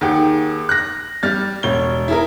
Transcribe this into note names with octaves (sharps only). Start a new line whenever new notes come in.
D#2 G#4 F#5 G5
F#6 A#6
G3 F6 A6
E1 C#5 G7
E4 G#4 A#4